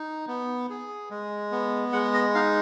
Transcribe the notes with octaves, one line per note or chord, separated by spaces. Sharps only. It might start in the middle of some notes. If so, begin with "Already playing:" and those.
Already playing: D#4
B3
G#4
G#3
B3
G#3 F#5
D#5
D#4 F5